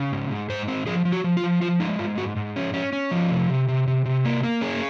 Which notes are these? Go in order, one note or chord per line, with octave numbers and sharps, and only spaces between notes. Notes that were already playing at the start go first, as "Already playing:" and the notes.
Already playing: C#3
G#2
G#2
G#2 C5
C4
F3 G#4
F3
F#4
F3
F4
F3
F3 F4
G#3 D#4
G#2 F4
G#2 F#4
G#2
C#4
C#4
C#4
F3
C3
C3
C3
C3
C3
A#3
A#3
C#4 G#4